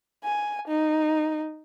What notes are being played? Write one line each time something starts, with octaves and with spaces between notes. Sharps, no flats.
G#5
D#4